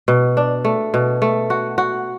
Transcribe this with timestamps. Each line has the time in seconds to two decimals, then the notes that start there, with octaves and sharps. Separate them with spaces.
0.08 B2
0.37 D4
0.65 A3
0.94 B2
1.22 A3
1.50 F#4
1.78 F#4